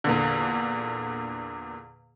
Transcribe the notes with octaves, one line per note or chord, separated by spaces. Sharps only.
E2 A#2 D3